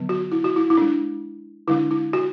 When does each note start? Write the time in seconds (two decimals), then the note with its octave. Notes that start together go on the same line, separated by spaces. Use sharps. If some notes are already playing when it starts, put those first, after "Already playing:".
Already playing: D3 F#3 B3
0.09 F#4
0.32 E4
0.44 F#4
0.56 E4
0.70 E4
0.77 G#3 D4
1.68 D3 G#3 D4 E4
1.91 E4
2.13 F#4